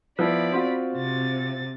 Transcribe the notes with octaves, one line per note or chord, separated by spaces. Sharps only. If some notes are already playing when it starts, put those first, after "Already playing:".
F3 B3 E4 D5 B5
C4 F4 F#4
C3 A6